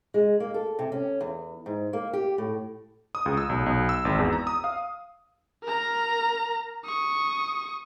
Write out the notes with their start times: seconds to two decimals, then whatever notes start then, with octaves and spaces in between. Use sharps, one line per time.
0.14 G#3
0.40 A#3
0.54 A4
0.79 C3
0.92 C#4
1.21 E2
1.66 G#2
1.93 A#3
2.13 G4
2.38 A2
3.15 D#6
3.26 C#2
3.37 E6
3.49 B1
3.66 B1
3.89 E6
4.05 G#1
4.19 E2
4.33 A#5
4.47 D#6
4.64 F5
5.63 A#4 A#5
6.85 C#6 D#6